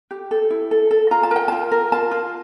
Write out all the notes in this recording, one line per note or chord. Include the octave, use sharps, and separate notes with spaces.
G4
A4
E4
A4
A4
F4 A#5
A5
A#4 G5
F4 A5
A#4
F4 A5
F4